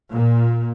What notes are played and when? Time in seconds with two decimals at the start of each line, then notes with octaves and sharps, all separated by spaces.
0.11 A#2